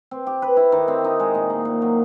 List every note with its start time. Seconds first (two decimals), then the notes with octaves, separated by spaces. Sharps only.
0.11 C4
0.27 G4
0.42 B4
0.57 E4
0.72 D#3
0.88 C4
1.04 D#4
1.20 G#3
1.35 A#2
1.50 A#3
1.65 A#2
1.82 F#3